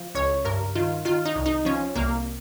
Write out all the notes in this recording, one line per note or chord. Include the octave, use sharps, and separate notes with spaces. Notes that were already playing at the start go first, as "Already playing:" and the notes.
Already playing: F3
C#2 C#5
G2 A#4
D#3 F4
D#3 F4
D#4
C2
D#4
F3 C#4
C2 A#3